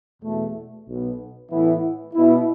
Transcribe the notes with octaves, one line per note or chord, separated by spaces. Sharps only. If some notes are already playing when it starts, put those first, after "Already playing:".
E2 B2 A3
B1 B2 B3
A2 E3 B3 E4
B2 B3 E4